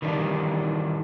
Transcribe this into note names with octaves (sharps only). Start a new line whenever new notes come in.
D#3 E3 G3 D4